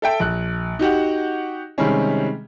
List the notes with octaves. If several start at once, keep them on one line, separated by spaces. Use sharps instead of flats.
A4 E5 G5
A#1 F#6
D#4 F#4 G4 F#5
C3 D#3 G3 G#3 C#4